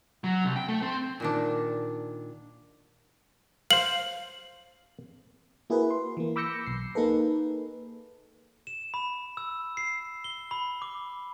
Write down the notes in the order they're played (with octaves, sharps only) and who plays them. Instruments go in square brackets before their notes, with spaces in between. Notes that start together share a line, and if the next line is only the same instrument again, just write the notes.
[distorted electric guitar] F#3
C2
G5
A3
C4
[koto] A#2 D#3 D4
[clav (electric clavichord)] C5 F5 [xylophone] F#7
[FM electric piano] A#3 E4 F#4 G#4 A#4 B4
C6
E3 A#3
B5 D6 E6 G6 A#6 C#7
B1 C7
A#3 D#4 G#4 A4 B4
[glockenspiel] E7
B5
E6
C7
G7
B5
D6